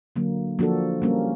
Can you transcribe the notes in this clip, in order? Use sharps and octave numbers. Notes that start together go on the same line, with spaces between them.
D3 F#3 A#3
F3 A#3 D4 F#4 A4
G3 A#3 C#4